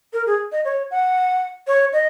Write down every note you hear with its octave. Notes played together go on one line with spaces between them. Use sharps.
A#4
G#4
D#5
C#5
F#5
C#5
D#5